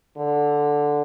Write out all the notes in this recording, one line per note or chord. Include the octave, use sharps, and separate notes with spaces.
D3